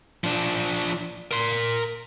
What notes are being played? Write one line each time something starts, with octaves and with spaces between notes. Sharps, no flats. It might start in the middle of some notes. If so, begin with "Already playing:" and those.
F3 D4
A#4 C6